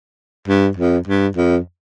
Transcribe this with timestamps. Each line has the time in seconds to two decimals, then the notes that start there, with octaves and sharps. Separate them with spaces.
0.48 G2
0.77 F2
1.07 G2
1.37 F2